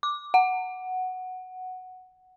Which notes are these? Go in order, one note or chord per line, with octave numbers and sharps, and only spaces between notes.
D6
F#5